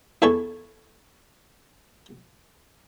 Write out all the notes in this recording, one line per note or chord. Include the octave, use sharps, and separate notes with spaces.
E2 E3 A4 G#5 A5 C#6